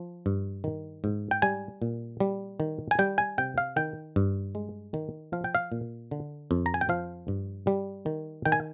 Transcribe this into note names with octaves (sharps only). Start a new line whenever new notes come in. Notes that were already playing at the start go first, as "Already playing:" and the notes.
Already playing: F3
G2
D#3
G#2
G5
G3 G#5
A#2
G3
D#3
G#5
G3 G5
G#5
C3 G5
F5
D#3 G5
G2
G#3
D#3
F3 F5
G5
F5
A#2
D3
F2
A#5
G#5
G5
F3 F5
G2
G3
D#3
D#3 G5
G#5